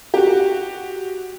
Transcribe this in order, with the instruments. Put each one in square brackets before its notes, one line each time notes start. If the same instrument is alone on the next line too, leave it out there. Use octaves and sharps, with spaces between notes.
[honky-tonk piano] F#4 G4